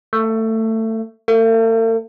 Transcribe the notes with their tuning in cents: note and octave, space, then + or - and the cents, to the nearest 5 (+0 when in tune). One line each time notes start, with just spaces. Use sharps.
A3 +20
A3 +45